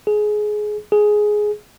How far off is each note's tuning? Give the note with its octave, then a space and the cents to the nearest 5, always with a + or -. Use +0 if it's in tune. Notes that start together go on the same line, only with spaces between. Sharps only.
G#4 +20
G#4 +10